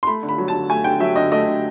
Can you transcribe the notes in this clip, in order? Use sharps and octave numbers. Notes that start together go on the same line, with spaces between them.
C6
A3 B5
D3
B5
F#3
A5
D3
A3 G#5
D3 G5
F#3 E5
D3 D#5
A3 D#5
D3